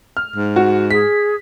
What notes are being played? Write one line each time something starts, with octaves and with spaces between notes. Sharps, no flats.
F6
G#2
F#4
G#4 B6